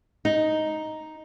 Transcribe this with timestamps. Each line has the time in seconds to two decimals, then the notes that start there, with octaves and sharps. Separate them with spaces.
0.25 D#4